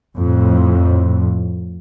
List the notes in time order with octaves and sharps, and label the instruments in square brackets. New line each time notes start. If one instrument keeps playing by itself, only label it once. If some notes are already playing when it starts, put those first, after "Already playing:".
[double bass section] F2 A2